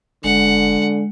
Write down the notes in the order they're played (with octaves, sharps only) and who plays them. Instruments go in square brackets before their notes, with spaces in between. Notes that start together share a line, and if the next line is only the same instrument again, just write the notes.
[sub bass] F#1 [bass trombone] D3 [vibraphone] G#3 [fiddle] F#5